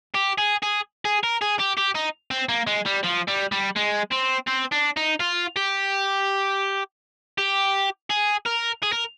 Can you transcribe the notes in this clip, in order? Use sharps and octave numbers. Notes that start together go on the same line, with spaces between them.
G4
G#4
G#4
G#4
A#4
G#4
G4
G4
D#4
C4
A#3
G#3
G3
F3
G3
G3
G#3
C4
C4
D4
D#4
F4
G4
G4
G#4
A#4
G#4
A#4